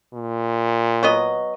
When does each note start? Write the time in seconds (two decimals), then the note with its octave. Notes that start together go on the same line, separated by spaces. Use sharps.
0.13 A#2
1.03 F#3 B3 D#5